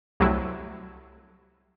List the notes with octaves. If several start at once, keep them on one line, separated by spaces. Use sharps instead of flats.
C2 C3 F#3 A3 E4